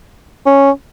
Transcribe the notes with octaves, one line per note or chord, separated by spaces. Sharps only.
C#4